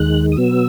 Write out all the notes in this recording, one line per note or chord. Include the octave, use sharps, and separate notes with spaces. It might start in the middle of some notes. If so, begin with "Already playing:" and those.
Already playing: D#2 D#3 G#3 F#6
D#6
B2 F#3 B3 E6